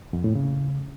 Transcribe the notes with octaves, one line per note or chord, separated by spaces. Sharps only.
F2
A2
C#3